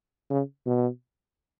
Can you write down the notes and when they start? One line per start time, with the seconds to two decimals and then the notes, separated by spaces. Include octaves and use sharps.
0.30 C#3
0.66 B2